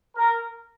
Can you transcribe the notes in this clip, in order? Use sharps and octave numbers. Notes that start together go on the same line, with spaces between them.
A#4